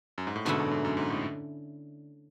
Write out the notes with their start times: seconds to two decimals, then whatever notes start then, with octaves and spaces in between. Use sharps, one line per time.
0.18 F#2
0.27 G#2
0.36 A2
0.45 G#2 B2 D3 A3 C#4 E4
0.59 F#2
0.71 G#2
0.85 F#2
0.97 G#2
1.10 A2